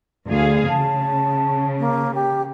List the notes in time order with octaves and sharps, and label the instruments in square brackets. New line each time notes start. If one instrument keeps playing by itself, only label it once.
[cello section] D2 G#4 F5
[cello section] C#3 [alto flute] A5
[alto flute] A#3
G4